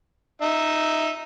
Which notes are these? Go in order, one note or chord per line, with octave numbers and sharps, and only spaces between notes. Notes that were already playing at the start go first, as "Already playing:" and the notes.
D#4 E5